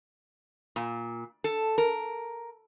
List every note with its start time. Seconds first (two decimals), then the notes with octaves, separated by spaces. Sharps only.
0.76 A#2
1.44 A4
1.78 A#4